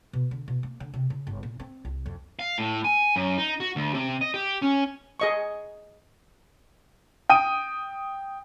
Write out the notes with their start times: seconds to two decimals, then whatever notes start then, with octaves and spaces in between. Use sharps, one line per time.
0.13 B2
0.31 D3
0.48 B2
0.63 A#3
0.80 D3
0.94 C3
1.10 C#3
1.27 G1
1.43 A#2
1.60 C4
1.85 C2
2.06 F2
2.39 F5
2.58 A2
2.84 G#5
3.16 F#2
3.38 D#4
3.60 F#4
3.76 D2
3.94 C3
4.21 D#5
4.34 G4
4.62 C#4
5.20 G#4 D#5 C#6
7.30 G5 D#6 D#7